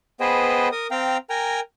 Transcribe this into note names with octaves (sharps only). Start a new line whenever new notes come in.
B3 G#4 B4 C5 D#5 G5
A#4 D#6
C4 F5 G5 A#5
A#4 G5 G#5 A#5